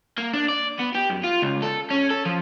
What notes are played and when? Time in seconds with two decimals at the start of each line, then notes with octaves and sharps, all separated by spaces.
0.18 A#3
0.33 D4
0.49 D5
0.79 B3
0.95 G4
1.10 F#2
1.24 F4
1.42 C#2
1.62 A4
1.91 C#4
2.11 A4
2.26 F3